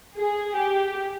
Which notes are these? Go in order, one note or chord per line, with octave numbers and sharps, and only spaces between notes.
G#4
G4